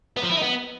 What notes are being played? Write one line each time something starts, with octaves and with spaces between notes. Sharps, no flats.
B3
F3
E4
D#4
B3